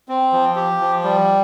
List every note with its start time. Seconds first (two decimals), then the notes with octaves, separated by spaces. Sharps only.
0.09 C4
0.33 F3
0.56 G4
0.80 F3
1.04 G3